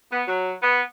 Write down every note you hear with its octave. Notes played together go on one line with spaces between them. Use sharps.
B3
F#3
B3